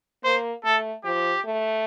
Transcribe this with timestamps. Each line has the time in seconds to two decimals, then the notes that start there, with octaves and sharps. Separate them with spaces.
0.24 A#3 C5
0.65 A3 A4
1.04 F3 G4
1.45 A3